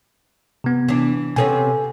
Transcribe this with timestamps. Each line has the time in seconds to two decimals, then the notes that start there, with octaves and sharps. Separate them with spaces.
0.64 C3 B3
0.88 E3 D4
1.36 C3 B3 C#4 A4 G#5